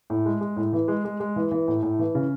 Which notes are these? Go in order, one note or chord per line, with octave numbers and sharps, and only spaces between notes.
A2
G#3
G#3
A2
E3
G#3
G#3
G#3
E3
E3
A2
A2
E3
C#3